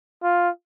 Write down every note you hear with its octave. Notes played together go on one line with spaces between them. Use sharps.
F4